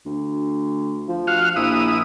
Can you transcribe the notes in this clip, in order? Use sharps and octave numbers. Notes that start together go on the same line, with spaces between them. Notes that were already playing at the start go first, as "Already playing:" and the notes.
D2
F3
F#4 F5
A#1 E4 D#6